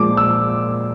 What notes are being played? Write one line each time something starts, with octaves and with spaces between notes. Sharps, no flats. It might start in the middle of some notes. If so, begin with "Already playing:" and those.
Already playing: A#2 F3 G#3 D6
E6